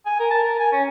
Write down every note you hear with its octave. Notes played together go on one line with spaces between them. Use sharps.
G#5
A#4
A5
A#4
G#5
C#4